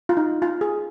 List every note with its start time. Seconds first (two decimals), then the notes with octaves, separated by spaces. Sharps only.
0.09 F4
0.17 D#4
0.42 F4
0.61 G#4